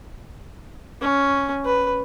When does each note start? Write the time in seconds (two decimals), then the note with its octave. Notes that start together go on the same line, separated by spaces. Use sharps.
1.01 C#4
1.65 B4